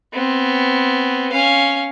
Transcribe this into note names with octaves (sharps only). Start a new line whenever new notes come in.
B3 C4
C#4 F5